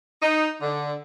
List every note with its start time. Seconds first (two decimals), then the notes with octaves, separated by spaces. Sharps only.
0.22 D#4
0.61 D3